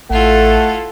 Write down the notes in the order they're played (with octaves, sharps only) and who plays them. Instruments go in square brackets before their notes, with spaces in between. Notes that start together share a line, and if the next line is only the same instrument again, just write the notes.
[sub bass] A1 [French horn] A3 [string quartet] E4 F4 A4 [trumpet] F#5